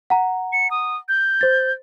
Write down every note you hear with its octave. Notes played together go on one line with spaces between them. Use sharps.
F#5 A#5
C#7
D#6
G6
C5 A6